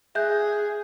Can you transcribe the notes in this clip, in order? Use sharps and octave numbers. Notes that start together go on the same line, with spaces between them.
G#4 E5 F#6 G6